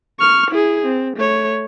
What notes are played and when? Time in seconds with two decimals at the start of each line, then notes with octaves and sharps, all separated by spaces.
0.19 C#6 F6
0.50 E4 G#4
0.86 C4
1.16 A3 C#5